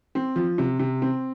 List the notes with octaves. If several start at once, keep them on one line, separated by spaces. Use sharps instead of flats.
C4
F3
C3
C3
C4